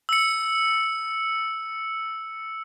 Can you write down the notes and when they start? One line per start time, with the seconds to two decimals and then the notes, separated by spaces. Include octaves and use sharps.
0.09 E6 C#7